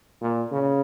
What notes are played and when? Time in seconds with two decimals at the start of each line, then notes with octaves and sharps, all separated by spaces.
0.21 A#2
0.52 C#3